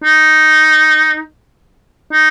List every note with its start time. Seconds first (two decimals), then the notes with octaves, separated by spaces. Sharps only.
0.04 D#4
2.12 D#4